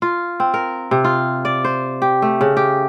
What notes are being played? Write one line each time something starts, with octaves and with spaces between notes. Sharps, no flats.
F4
C4
A#4
C3
F4
D5
C5
G4
A3
C#3
G4